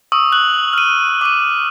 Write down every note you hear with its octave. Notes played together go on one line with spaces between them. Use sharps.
C#6 D#6 E6
F#6 F#7
F6 D#7
D6 D#7